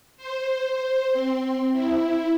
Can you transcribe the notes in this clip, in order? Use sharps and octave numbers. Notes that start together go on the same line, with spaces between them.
C5
C4
E4